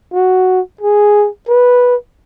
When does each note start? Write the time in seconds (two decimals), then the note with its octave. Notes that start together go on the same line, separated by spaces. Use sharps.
0.13 F#4
0.81 G#4
1.48 B4